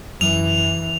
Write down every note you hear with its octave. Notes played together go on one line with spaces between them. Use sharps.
F#2 E3 F7